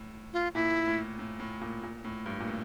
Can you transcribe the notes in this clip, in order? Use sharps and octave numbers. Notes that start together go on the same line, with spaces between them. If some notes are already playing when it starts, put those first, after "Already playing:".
Already playing: A2
F4
A#2 E4
A2
A2
A2
A#2
A#2
A2
G2
A#2
A2